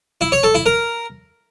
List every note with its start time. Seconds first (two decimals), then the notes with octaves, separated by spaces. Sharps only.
0.21 E4
0.32 C#5
0.43 A4
0.55 E4
0.66 A#4